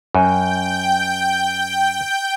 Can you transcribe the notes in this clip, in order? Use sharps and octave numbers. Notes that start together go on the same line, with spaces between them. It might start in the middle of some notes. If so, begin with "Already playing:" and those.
F#2 G5 G6